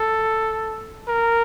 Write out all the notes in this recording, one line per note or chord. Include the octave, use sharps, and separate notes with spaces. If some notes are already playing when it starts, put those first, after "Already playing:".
Already playing: A4
A#4